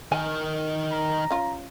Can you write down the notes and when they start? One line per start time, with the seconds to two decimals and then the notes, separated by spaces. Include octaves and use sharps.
0.12 D#3 A#4 G#5
0.91 A#5
1.31 C#4 F4